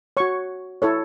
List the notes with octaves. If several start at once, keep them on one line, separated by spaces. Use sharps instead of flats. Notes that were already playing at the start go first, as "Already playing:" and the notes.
F#4 C#5 C#6
E4 A4 C#5